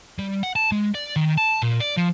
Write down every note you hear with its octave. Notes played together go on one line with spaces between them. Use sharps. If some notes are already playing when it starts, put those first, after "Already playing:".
G3
F#5
A5
G#3
D5
D#3
A5
A#2
D5
F3